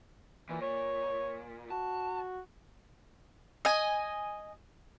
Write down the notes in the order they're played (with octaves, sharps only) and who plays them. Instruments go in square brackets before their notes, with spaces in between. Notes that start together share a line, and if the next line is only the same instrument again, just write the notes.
[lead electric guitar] A#2 [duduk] E3
[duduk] C#5
[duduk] F#4 [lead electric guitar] A5
[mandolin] D#5 G#5